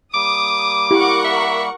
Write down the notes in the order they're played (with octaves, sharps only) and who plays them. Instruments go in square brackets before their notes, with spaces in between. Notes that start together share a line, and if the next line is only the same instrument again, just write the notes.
[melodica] G3 A#3 [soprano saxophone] D6 [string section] D#6
[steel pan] E4 G4 [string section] A#4 F#5 C#6
[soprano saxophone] E5